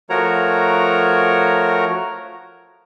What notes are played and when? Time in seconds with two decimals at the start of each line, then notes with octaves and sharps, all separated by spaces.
0.10 F3 A3 F#4 A#4 C#5 A#5